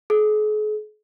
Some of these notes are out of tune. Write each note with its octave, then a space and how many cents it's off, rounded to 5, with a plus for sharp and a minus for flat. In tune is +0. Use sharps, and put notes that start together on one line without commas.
G#4 +45